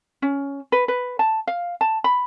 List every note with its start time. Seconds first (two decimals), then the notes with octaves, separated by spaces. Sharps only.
0.22 C#4
0.72 B4
0.88 B4
1.19 A5
1.47 F5
1.81 A5
2.04 B5